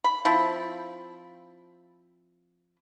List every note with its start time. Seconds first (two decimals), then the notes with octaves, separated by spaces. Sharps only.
0.04 B5
0.25 F3 C4 E4